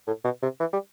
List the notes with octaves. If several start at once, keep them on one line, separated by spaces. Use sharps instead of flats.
A2
B2
C3
E3
G3